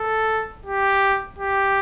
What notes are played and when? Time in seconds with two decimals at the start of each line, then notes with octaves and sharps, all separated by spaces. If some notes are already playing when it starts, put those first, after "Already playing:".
Already playing: A4
0.66 G4
1.38 G4